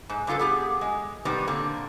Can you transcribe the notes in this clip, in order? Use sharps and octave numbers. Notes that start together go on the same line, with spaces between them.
G#2
G2 C#3 F4 A4 B4
B3 G4 G#4
G#3
C3 D#3 G3 B3 C4
A#2 D3 A#3 C4